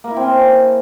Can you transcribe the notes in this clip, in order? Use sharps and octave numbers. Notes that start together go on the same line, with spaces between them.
A#3
E4
C4
C#4